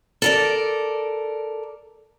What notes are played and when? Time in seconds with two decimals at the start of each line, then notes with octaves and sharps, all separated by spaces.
0.22 A4 A#4 D5